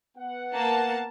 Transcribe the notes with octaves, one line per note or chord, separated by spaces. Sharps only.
B3 F#5
A#3 A5